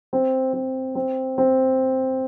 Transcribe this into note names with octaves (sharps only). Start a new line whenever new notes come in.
C4
C4
C4
C4